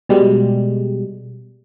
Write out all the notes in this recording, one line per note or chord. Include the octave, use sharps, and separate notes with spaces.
B2 G3 G#3